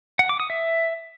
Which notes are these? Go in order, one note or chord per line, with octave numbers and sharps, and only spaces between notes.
F#5
D6
D#6
E5